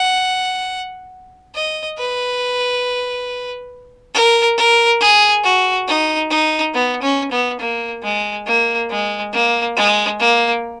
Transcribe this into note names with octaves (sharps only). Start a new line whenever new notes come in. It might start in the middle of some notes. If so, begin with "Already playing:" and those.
Already playing: F#5
D#5
B4
A#4
A#4
G#4
F#4
D#4
D#4
B3
C#4
B3
A#3
G#3
A#3
G#3
A#3
G#3
A#3